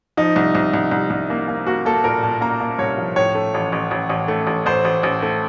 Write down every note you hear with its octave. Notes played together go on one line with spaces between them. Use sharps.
F3 D#4
C2
C2
C2
C2
C2
A#3
A#3
A#3 F#4
A#3 A4
A#2 A#4
A#2 A5
A#3 A#5
A#3
C2 C#5
F3
A2 C#5
A3
A1
A1
A1
A1
A3
A1
A1 C5
A1
A1
A3